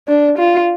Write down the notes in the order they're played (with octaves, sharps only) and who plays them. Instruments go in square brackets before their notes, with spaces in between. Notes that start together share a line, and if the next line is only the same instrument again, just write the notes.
[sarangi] D4
F4